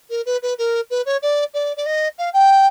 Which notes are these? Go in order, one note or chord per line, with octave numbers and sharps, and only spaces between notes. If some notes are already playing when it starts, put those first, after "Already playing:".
A#4
B4
B4
A#4
B4
C#5
D5
D5
D5
D#5
F5
G5